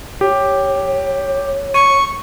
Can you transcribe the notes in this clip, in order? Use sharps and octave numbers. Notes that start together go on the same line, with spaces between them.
G4 C#5
C#6 D#7